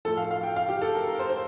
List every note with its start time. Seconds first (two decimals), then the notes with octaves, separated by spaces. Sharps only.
0.05 F3 A4
0.08 A2
0.17 F5
0.31 F5
0.43 G5
0.56 F5
0.69 G4
0.82 A4
0.95 A#4
1.07 A#4
1.19 C5
1.30 C5